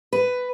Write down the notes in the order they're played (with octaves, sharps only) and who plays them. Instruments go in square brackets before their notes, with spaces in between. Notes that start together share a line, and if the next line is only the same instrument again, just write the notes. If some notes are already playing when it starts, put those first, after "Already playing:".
[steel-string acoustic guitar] B4